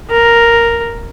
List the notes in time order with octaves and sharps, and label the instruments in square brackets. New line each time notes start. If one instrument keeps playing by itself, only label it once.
[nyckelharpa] A#4